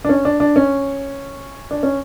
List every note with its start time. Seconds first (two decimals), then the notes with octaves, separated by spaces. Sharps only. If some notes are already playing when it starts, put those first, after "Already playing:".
0.05 D4
0.09 C#4
0.25 D4
0.40 D4
0.56 C#4
1.71 D4
1.83 C#4